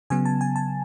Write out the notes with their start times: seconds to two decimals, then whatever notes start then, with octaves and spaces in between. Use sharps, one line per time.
0.10 C#3 F#3 B3 G#5
0.25 A5
0.41 G#5
0.56 A5